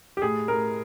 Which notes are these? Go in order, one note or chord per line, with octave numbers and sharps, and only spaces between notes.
G4
A2 G#4
A2 A#4